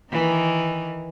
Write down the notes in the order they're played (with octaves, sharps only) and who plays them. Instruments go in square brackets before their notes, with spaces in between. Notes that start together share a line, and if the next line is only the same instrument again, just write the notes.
[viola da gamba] D#3 E3